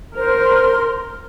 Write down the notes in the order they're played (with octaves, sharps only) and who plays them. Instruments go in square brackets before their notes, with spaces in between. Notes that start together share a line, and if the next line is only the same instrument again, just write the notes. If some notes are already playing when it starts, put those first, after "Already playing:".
[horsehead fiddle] A#4 [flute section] C5
[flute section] C6